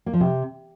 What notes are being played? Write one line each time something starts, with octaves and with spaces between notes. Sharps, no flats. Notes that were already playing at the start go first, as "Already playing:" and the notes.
A#3
F3
C3